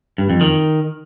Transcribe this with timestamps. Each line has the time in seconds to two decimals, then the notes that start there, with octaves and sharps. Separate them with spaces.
0.18 G2
0.30 F2
0.41 D#3